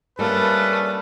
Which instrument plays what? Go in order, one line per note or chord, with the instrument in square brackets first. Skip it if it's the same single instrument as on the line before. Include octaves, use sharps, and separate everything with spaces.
[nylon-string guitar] G3 A#3 [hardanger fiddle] A3 [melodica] C#4 D4 A4 [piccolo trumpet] B4